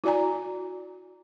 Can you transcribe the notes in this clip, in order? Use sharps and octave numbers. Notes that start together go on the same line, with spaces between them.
E4 F#4 D5 G#5 A#5